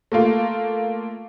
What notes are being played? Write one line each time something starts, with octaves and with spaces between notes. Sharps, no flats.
A3 A#3 F4